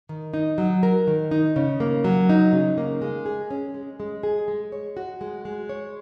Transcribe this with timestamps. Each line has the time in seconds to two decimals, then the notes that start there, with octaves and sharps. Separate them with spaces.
0.09 D#3
0.34 D#4
0.58 F#3
0.83 A#4
1.07 D#3
1.31 D#4
1.56 C#3
1.80 A#3
2.04 F#3
2.29 D#4
2.53 C#3
2.78 A#3
3.02 G#3
3.26 G#4
3.51 C#4
3.74 G#3
4.00 G#3
4.23 G#4
4.48 G#3
4.72 C#5
4.97 F#4
5.21 G#3
5.45 G#3
5.69 C#5